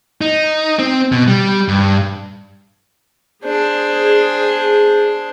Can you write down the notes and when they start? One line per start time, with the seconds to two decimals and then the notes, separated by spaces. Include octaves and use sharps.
0.21 D#4
0.79 C4
1.12 B2
1.28 G3
1.68 G2
3.44 D4 G#4 C5